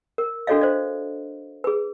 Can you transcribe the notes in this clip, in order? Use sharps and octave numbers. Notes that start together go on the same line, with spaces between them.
A#4
D4 F#4 A4 C#5 D#5 F5
C5 D5
G#4 B4